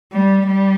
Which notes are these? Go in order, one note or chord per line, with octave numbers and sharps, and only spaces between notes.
G3
G3